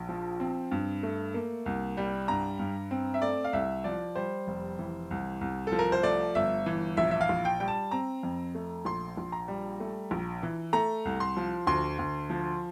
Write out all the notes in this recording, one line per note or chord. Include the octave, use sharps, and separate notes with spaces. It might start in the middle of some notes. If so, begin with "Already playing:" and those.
Already playing: A#1
F3
C4
G2
A3
A#3
C2
G3
G2 A#5
G2
C4
E5
A3 D5
F5
C2 E5
F3 D5
G3 C5
F1
E3
C2
C2
A4
F3
A#4
C5
A3 D5
G1 E5
E3
A#1 E5
E5
F5
A#1
G5
G3 G5
A5
C4 A#5
F2
A3
A#1 C6
A#1
A#5
G3
A3
A#1
E3
A3 A#5
C2
C6
F3
D2 C6
D2
F3